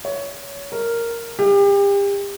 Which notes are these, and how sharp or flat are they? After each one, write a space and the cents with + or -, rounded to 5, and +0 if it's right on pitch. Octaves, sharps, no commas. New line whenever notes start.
C#5 +20
A#4 -5
G4 +35